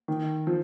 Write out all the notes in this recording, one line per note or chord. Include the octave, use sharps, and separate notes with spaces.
D#3
F3